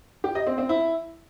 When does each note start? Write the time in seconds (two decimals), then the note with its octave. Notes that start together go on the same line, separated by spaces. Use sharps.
0.24 G4
0.35 D#5
0.47 C4
0.58 C4
0.69 E4